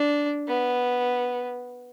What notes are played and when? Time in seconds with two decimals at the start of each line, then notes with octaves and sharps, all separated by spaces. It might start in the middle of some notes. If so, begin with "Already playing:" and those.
Already playing: D4
0.48 B3